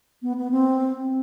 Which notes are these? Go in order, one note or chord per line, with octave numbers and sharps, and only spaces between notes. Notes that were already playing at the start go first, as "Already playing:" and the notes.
B3
B3
C4